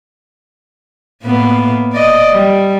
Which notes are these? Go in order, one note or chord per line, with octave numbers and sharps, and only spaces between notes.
A2 A#3 B3
D5 D#5
G3